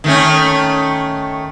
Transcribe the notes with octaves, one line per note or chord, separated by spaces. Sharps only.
D#3 A3 C#4